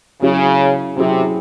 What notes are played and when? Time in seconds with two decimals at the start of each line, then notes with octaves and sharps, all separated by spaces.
0.21 C#3 F#3 C#4 E4 G#4
0.96 C3 F#3 C#4 E4 G#4